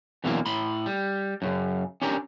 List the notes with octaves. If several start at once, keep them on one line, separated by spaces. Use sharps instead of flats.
F2 B2 D3 E3 F#3 A#3
A2 B5 C6
G3
F#2 A2 C#3
C#4 D4 G4 A#4